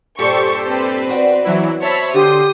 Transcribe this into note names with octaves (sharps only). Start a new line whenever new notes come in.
G2 A#2 G4 A4 C5 C#6
C4 B4
E2 F#4 D5
E3 F#3 E4
C5 C#5 E5 A5 B5
D3 G4 C6 D#6